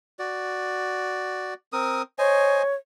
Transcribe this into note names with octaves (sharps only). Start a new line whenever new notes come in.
F#4 D5
C4 A#4 D#6
C5 C#5 D#5 G#5